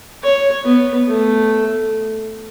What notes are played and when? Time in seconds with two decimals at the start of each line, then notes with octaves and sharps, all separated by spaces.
0.23 C#5
0.65 B3
1.07 A3